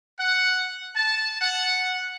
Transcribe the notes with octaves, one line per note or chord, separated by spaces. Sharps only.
F#5
A5
F#5